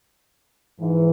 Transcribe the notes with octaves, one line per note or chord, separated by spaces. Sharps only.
G#2 E3